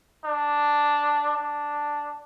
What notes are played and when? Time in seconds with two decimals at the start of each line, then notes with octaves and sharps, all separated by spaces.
0.24 D4
1.36 D4